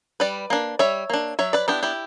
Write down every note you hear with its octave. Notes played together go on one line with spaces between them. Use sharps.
G3 B4 D5
A#3 D4
G3 C#5 E5
A#3 D4
F#3 C#5 E5
B4 D5
B3 D4 E4 G4
E4 G4